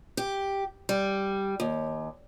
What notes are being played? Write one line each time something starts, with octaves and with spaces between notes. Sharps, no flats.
G4
G3
D#2